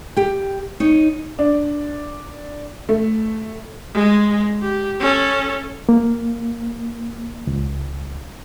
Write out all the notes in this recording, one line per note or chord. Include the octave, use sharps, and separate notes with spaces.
G4 G5
D#4 C#5
D4
A3
G#3
G4
C#4 A4
A#3
C#2